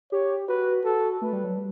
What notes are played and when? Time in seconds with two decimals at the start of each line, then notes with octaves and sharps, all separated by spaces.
0.12 G4 C#5
0.48 F#4 B4
0.84 F#4 A4
1.21 A3 B4
1.33 G3
1.44 F#3
1.55 G3